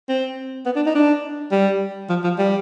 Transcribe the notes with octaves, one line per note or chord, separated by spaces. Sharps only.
C4
B3
D4
D#4
D4
G3
F3
F3
G3